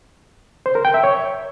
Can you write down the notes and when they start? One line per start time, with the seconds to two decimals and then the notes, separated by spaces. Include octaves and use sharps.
0.66 C5
0.75 A#4
0.85 G5
0.94 E5
1.04 C#5